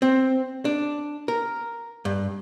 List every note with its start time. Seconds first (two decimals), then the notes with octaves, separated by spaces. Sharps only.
0.02 C4
0.65 D4
1.28 A#4
2.05 G2